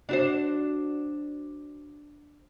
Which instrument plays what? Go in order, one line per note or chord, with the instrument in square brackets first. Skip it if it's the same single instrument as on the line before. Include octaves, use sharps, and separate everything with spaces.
[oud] D4 F#4 C5